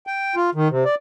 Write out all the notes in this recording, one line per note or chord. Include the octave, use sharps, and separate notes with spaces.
G5
F4
D#3
C3
D5